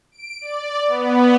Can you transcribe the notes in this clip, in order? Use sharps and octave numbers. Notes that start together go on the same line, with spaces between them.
D7
D5
B3